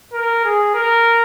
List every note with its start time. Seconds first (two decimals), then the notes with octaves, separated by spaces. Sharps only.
0.13 A#4
0.44 G#4
0.74 A#4